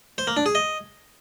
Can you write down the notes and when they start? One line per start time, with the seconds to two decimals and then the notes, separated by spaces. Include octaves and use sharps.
0.18 C5
0.27 A#3
0.37 D4
0.46 G#4
0.55 D#5